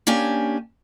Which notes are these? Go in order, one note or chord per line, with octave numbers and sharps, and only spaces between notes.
A#3 C#4 D4 G4 G#5